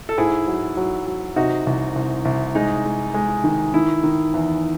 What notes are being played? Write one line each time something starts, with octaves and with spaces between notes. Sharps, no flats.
A4
G#2 E4 G#4
F#3
F#3
F#3
C3 D#4 F#4
C2
C2
C2
G#3 D#4
G#3
G#3
D#3
D#3 E4
D#3
E2